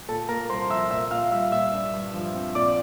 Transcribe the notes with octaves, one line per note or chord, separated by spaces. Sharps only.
A#2 A4 A5
A#3 A#4 A#5
C2 C5 C6
F3 E5 E6
A#2 E5 E6
A#2 F5 F6
G3 E5 E6
A#2 E5 E6
G2
G2
F3
C4
A#2 D5 D6